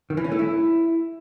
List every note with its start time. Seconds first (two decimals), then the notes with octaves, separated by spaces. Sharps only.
0.10 D#3
0.17 E3
0.24 C#4
0.32 A3
0.39 E4